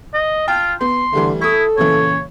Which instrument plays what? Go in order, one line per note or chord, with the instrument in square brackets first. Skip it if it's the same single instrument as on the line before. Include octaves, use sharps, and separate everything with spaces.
[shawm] D#5
[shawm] F4 [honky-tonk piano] G5 A5
[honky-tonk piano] B3 [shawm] C6
[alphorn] D3 [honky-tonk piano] E3 G3 A3
[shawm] E4 [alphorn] A4 [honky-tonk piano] C#6 D#6
[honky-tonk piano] A#2 C#3 E3 [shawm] C#5